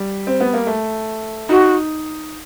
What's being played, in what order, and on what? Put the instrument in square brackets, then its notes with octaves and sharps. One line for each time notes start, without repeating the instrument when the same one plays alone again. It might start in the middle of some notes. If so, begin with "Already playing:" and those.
Already playing: [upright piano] G3
C4
B3
A#3
A3
[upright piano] D#4 [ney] F#4